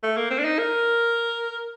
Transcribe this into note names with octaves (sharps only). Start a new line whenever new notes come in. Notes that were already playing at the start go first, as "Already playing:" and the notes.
A3
A#3
C4
D4
D#4
A#4